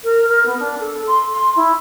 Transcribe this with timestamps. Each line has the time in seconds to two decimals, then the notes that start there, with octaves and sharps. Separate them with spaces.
0.04 A#4
0.28 A#4
0.45 B3
0.59 D4
0.80 A4
1.07 C6
1.32 C6
1.56 E4